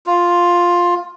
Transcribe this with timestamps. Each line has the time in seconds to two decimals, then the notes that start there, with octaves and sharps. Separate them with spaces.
0.06 F4